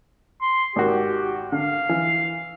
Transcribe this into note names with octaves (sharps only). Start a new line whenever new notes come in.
C6
G#1 D#3 F#4 G4
D3 F5
E3